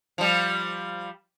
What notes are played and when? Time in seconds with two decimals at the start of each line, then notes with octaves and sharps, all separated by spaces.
0.18 F3 G3